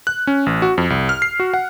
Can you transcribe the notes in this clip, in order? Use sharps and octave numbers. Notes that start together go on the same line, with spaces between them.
F#6
C#4
A1
F#4
F2
C2
F6
C7
F#4
F#5